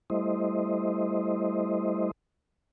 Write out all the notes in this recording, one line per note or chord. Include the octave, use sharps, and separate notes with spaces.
G3 A3 E4 C5 D#5